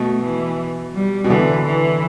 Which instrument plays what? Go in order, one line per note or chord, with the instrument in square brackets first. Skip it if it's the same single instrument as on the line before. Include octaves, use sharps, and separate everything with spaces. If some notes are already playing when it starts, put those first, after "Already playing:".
Already playing: [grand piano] B2 [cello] A3
[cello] E3
G3
[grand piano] B2
[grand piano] D3 [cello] E3
[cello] E3